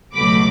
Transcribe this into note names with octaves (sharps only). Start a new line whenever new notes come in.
C#2 B2 F#3 A3 B5 D6